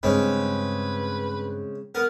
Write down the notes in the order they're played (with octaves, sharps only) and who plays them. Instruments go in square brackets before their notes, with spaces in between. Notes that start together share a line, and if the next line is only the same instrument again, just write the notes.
[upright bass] G2 [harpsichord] C#3 G#3 C4 [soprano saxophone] B4
[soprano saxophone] B3 [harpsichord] A#4